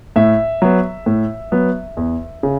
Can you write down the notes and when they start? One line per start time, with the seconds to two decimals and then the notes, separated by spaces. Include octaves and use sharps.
0.16 A2 E5
0.62 F#3 B3
1.06 A2
1.52 F#3 B3
1.97 E2
2.43 C#3